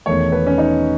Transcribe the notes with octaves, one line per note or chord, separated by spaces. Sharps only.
E1 E2 D#3 A3 C#5
B4
C#4
D#4